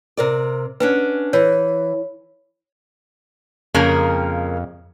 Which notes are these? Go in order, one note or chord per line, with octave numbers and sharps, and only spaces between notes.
C3 A#4 D5
C#4 D4 B4 F#5
E3 C#5
F2 C#3 A#3 A#4